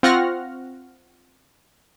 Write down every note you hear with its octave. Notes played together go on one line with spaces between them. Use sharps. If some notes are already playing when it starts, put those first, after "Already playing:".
C4 F4 F#5 C#6 F6 A#6